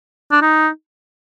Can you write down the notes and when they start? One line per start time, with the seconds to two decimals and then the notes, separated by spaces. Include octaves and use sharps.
0.32 D4
0.42 D#4